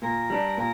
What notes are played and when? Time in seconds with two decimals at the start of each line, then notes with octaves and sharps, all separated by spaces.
0.02 A#2 A#4
0.30 G3 D4
0.58 A#2 A#4